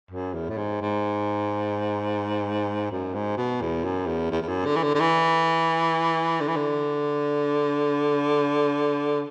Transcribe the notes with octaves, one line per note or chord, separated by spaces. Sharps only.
F#2
E2
A2
G#2
G#2
F#2
G#2
B2
E2
F#2
E2
E2
E2
F#2
D3
E3
D3
D3
E3
D3
E3
D3